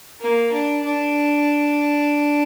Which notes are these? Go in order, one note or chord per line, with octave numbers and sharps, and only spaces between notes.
A#3
D4
D4